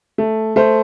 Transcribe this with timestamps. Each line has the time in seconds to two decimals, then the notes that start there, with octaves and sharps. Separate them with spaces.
0.18 A3
0.56 A3 C5